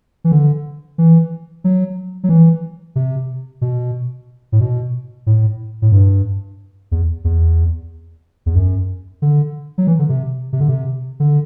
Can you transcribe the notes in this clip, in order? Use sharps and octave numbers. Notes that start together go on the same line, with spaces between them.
E3
D3
E3
F#3
F#3
E3
C3
B2
A2
B2
A2
A2
G2
E2
E2
E2
F#2
D3
F#3
E3
D3
C3
C3
D3
C3
D3